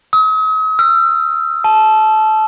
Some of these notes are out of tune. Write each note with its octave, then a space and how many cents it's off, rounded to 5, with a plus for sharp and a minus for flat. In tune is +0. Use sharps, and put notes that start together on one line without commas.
D#6 +45
E6 +45
A5 -20